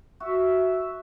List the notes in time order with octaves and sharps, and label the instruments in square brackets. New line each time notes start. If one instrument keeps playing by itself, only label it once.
[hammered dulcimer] F#4 [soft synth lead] E5